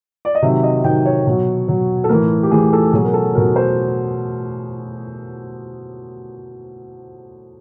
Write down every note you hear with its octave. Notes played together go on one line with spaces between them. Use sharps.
D5
D#5
C3 D#3 F#3 E5
D#5
C3 D#3 F#3 G5
C#5
B2 F#3
B2 F#3
A4
A2 E3 A#4
G4
A2 E3 G#4
A4
B2 F#3 G#4
A#4
A4
B2 F#3 A#4
C5